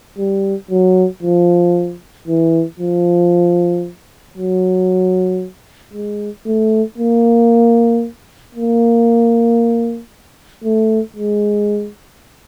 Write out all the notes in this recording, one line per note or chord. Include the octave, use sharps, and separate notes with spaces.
G3
F#3
F3
E3
F3
F#3
G#3
A3
A#3
A#3
A3
G#3